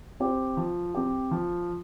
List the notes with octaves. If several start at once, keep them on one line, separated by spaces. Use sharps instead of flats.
C4 G4 C5
F3
C4 G4
F3